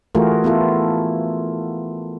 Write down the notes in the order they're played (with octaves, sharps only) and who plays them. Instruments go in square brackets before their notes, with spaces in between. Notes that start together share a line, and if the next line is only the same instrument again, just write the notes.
[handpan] E3 A3 F4 F#4 G#4 A#4
B3 E4 F4 A4